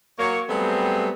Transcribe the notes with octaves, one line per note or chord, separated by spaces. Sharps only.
F#3 A#3 C#5
F#3 G3 A3 B3 C4 G#4